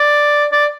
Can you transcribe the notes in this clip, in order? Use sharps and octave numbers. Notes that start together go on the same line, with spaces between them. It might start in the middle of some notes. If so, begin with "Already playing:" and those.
Already playing: D5
D5